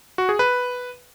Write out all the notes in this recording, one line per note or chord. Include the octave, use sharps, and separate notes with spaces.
F#4
G#4
B4